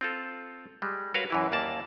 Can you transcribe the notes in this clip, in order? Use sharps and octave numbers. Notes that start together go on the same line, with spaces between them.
C4 F4 A4
G3 G#3
F#4 A#4 B4 C#5 F5
F#2 E3 E4
D#2 A#3 D5 A5